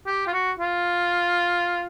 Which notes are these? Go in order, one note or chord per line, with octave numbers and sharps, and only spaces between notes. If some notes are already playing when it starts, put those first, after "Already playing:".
G4
F4
F#4
F4